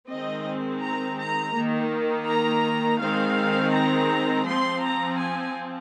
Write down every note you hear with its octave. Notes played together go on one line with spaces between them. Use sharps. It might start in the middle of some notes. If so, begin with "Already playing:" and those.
D#3 G#3 C4 D#5
A#5
A#5
D#3 A#3
A#5
D#3 G#3 C4 F5
A#5
F3 C4 C6
A#5
G#5